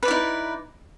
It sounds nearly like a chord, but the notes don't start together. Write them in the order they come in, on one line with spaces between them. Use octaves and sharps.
B4 D5 E4 D#4